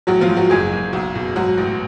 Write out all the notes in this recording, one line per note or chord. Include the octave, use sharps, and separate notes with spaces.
A1 F#3 F#4
F3 F4
G#2
F#3 F#4
F#1 G#3 G#4
F#1
B1
B2
G#2 F#3 F#4
A1